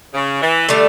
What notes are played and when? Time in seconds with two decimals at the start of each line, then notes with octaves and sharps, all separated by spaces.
0.14 C#3
0.42 E3
0.69 D3 G3 A3 D4